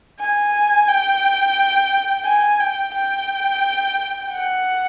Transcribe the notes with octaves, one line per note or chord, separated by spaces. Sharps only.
G#5
G5
G#5
G5
G5
F#5